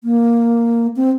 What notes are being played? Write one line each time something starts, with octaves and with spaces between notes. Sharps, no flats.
A#3
C4